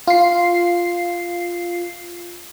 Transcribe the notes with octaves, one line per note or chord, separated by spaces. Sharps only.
F4 C7